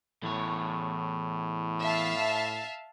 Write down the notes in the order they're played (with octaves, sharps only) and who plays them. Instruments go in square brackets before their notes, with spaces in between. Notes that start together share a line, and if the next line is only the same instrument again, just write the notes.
[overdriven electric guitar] E2 C#5 [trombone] A2
[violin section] E5 F5 A5